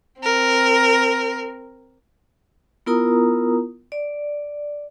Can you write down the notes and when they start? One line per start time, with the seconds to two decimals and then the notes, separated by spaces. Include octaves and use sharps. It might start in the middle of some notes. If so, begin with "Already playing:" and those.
0.20 C4 A#4
2.86 B3 E4 F4 A#4 A#5 D#6
3.92 D5